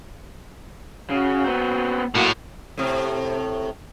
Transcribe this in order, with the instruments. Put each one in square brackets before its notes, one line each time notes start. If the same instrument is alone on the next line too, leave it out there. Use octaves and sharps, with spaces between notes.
[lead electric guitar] C#3 [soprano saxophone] F#4
[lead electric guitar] B3 C4
[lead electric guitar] B1 F#3 [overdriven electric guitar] A2 [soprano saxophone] A#3
[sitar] A2 C3